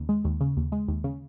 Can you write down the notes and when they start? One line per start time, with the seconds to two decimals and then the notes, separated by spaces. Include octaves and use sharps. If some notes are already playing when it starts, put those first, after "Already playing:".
Already playing: D#2 C#3
0.09 G#3
0.25 D#2
0.41 C#3
0.57 D#2
0.72 G#3
0.88 D#2
1.04 C#3